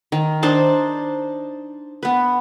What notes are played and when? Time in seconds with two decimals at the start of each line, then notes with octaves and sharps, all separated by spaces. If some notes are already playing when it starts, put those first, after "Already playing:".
0.12 D#3
0.43 D4 D#4 C5 A5
2.03 B3 B4